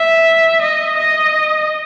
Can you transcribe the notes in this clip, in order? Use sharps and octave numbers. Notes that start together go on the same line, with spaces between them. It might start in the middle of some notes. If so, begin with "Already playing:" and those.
Already playing: E5
D#5
D#5